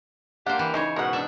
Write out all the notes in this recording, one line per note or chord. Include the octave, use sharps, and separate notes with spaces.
A#3 D4 G4 C5 F#5
E3
C#3 D#4 C5 C#5
G#2 B2 A#4 F#5
D4 E5